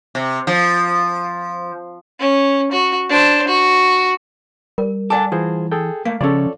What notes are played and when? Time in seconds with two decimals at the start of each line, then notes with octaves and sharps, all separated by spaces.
0.15 C3
0.47 F3
2.20 C#4
2.72 F#4
3.09 D4 C5
3.48 F#4
4.78 G3 A#4
5.10 A4 D5 F#5 G#5 A5 D6
5.32 E3 F4 G#4 C5
5.72 G#4 A4 G5
6.05 A3 A#3 F5
6.21 C#3 F3 C#4 A4 C#5 D5